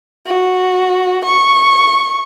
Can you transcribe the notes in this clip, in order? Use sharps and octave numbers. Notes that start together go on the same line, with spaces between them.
F#4
C#6